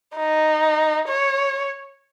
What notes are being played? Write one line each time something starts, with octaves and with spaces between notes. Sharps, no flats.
D#4
C#5